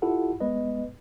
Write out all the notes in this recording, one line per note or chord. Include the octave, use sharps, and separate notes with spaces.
E4 F4 G4 A4 F#5
G#3 B3 B4 D#5